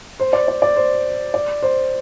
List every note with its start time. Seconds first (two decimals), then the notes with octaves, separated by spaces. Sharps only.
0.20 C5
0.33 D5
0.48 D5
0.62 D5
0.77 C5
1.34 D5
1.63 C5